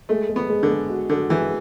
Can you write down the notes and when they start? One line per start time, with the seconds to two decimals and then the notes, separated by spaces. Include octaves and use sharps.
0.09 G#3 A3
0.29 G#3
0.36 B3
0.49 G#3
0.63 D3
0.70 G#3
0.89 F#4
1.09 D3 F#4
1.30 E3 G#3